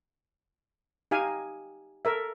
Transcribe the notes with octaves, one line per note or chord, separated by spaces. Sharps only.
D#4 G4 F5 G#5
A4 A#4 E5